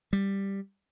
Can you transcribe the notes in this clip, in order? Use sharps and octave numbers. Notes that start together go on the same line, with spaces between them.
G3